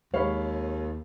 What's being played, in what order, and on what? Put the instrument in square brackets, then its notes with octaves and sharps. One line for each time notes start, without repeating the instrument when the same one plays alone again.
[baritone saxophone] D#2 [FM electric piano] G#3 [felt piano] C#5 [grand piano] F5 B5